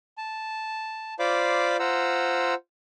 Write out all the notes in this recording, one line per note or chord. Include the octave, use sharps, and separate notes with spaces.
A5
F4 C5 D5 F5 B5 D6
F4 C5 F#5 A#5 E6